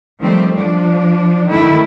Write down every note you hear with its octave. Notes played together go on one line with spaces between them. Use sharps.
D#3 F3 G3 A3 C4
F3 D4
D#3 A3 E4